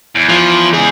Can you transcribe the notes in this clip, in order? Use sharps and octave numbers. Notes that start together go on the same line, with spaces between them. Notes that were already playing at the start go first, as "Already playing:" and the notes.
E2
F3
C#2 G#4